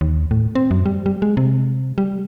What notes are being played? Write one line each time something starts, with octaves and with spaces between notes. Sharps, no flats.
D#2
A2
C4
F#2
G3
G3
G#3
C3
G3